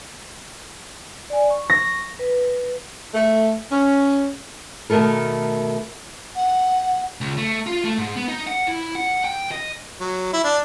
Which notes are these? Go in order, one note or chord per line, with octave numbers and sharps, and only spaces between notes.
D5 G#5
C#6
A#6
B4
A3
C#4
B2 D#3 A3 A4 A#4
F#5
C#2
A3
F4
A3
G#2
B3
D#4
F#5
E4
F#5
G5
D#5
F#3
E4
D4